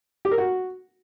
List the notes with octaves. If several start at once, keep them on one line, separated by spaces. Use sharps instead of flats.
G4
A#4
F#4